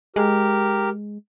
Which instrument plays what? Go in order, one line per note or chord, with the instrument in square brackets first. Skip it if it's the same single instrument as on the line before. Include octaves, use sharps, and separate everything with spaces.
[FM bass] G#3 [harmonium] G4 A#4